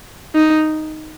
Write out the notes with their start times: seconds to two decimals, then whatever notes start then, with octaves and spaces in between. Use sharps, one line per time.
0.36 D#4